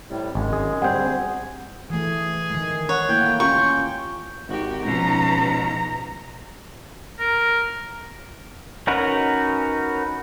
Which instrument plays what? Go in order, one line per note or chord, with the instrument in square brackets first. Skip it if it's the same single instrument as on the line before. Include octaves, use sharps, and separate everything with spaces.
[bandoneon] A2 C3 G3
[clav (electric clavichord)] G#1 [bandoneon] F#2 G#3
[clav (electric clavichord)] G#4
[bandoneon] D2 G#4 [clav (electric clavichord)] G3 C4 [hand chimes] F#5 G6
[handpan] E3 A3 [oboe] G#4
[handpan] D#3 G#3
[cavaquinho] C#5 [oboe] F#5
[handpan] A3 A#3 E4 [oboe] G5
[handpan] C#4 F4 G4 [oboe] G5 [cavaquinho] C#6
[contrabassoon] G#1 [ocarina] D#4 [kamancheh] F#4 G4
[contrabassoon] C#2 [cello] B2 F3 [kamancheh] A#5
[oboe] A#4
[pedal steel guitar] C#4 D#4 F#4 A#4 B4